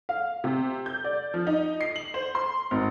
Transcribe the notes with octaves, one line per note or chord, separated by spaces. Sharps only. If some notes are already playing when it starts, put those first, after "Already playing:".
F5
C3
G6
D5
F3
D#4
C7
F#7
C5
C6
G#1